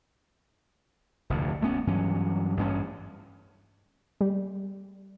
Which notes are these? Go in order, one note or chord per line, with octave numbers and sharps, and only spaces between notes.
F1 D2 A2
D2 A3 B3 C#4
G2 E3 F#3 C#4
A1 G2 C4 C#4
G3